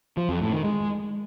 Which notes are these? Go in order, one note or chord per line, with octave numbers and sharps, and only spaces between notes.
F3
F2
A2
D#3
G#3